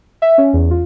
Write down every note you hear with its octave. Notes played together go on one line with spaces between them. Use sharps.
E5
C#4
E2
F4